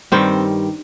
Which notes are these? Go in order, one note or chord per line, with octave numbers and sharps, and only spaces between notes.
G2 D#3 G3 C4